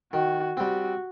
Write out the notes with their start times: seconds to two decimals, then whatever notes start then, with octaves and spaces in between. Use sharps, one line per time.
0.13 D#3 F#4
0.57 G3 C4 F#4